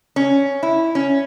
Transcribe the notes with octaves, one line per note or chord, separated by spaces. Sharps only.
C#4
E4
C#4